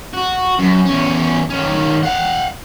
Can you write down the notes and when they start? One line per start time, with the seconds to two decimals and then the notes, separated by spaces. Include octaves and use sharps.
0.14 F#4
0.59 F#2
0.86 E2 C#4
1.50 D#3 C#4
2.04 F5 F#5